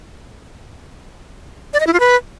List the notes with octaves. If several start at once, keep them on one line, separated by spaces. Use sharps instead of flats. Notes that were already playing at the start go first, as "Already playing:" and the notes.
D5
D#5
E4
F4
B4